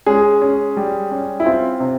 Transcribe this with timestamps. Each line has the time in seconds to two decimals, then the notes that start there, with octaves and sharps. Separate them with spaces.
0.06 G#3 C#4 G#4
0.42 C#4
0.77 G3
1.11 C#4
1.40 E4
1.46 C4 F4
1.80 C3